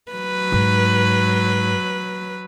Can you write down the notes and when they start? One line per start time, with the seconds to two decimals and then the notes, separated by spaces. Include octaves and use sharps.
0.12 F#3 B4
0.52 G#2